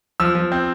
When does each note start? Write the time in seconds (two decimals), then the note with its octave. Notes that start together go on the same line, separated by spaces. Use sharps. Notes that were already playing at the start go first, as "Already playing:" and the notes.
0.20 F3 E6
0.35 F3
0.52 C4